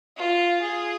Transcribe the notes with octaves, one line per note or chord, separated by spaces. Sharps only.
F4
G#4